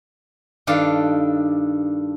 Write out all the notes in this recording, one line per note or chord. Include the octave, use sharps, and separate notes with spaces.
G2 D#3 D4 A4 D5 F5